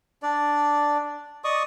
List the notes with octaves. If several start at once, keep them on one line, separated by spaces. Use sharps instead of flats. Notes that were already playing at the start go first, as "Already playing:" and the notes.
D4 D5
D5 D#5 C#6 D#6